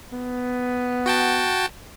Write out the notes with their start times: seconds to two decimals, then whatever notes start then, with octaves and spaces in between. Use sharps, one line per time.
0.12 B3
1.06 F#4 G5 A5